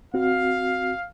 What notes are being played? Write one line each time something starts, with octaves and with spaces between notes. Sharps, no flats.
C4 F#4 F5